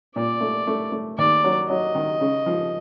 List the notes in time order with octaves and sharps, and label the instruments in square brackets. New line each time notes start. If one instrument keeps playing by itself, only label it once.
[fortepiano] A#2 [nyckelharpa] D5
[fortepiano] A3
A3
A3
[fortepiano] D#2 [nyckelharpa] D5
[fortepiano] F#3
[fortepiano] F#3 [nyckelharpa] D#5
[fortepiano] D#3
C#3
F3